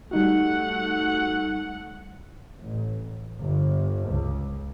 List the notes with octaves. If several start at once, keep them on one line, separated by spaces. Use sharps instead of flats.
G3 A3 D#4 F#4 F#5
A1
G1
C#2